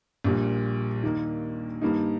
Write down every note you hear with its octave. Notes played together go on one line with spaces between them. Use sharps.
A#1 A#2 G3
D#2 D#3 A#3 D#4
G2 D#3 A#3 D#4